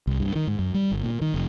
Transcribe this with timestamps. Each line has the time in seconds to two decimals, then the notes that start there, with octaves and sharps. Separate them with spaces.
0.07 C2
0.20 G2
0.36 D#3
0.47 G#2
0.59 F#2
0.74 G3
0.91 G1
1.03 A#2
1.21 D#3
1.34 F1